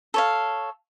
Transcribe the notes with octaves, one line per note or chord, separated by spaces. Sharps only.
A4 C#5 F5